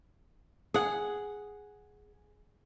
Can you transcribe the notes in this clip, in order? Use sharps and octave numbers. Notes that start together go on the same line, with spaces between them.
G#4 F#5